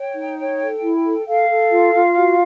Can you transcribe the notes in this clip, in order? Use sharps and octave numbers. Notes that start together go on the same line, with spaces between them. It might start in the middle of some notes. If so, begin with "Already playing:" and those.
Already playing: C#5 G5
D#4
C#5
A4
E4
A4
A4 F5
A4
F4
F4
F#4